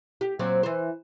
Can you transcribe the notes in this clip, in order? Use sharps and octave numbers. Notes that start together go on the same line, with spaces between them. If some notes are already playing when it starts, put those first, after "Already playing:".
G4
A#2 F#3 C4
E3 C5